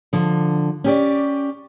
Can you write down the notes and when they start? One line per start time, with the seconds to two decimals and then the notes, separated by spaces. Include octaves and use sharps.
0.13 D3 F3
0.84 C#4 G4 D5